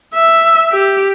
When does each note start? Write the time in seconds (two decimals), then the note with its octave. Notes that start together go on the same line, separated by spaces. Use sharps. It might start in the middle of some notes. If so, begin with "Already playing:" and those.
0.15 E5
0.72 G4